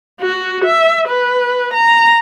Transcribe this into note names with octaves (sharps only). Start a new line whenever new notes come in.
F#4
E5
B4
A#5